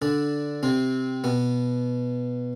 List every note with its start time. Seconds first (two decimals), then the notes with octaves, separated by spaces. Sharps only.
0.02 D3 D4
0.63 C3 C4
1.24 B2 B3